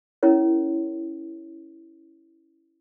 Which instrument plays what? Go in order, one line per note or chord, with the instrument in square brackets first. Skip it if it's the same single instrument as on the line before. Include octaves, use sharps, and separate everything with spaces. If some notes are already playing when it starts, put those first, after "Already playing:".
[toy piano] C#4 E4 A#4 C#5